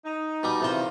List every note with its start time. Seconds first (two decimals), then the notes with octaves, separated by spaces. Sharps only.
0.04 D#4
0.43 B2 G3 D6
0.61 E2 C3 D#3 F4 C5